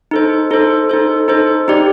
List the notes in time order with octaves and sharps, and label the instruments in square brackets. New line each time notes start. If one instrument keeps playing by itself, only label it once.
[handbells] D#4 A4 C5
D#4 A4 C5
D#4 A4 C5
D#4 A4 C5
D#4 G4 D5